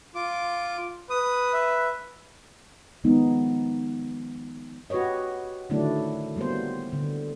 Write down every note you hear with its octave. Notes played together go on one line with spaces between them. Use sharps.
F4 D6
B4 D#6
E5
D#3 F3 G#3 B3 D#4
F#4 G4 B4 C#5 D#5
D3 D#3 F#3 A3 D4 E4
F#3 G3 A#3 B3 C5
D3